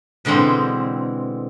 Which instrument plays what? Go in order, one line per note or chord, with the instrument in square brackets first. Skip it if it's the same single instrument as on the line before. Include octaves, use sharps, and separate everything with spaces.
[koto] B2 D3 E3 G#3 C4